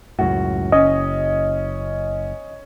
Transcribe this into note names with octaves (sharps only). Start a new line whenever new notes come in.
C#2 F#2 A2 F#4
F#1 C#4 D#5